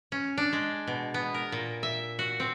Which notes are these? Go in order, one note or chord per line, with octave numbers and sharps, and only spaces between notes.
C#4
D4
G#3
B2
B3
A#4
A#2
E5
F#4
C4